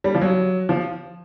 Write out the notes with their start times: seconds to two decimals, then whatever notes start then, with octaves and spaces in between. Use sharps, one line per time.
0.04 G3
0.15 F3
0.21 F#3
0.69 F3